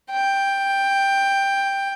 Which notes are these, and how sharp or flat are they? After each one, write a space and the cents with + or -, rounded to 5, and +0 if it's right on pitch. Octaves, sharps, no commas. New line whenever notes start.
G5 +10